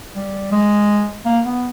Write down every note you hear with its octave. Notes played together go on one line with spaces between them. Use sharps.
G3
G#3
A#3
B3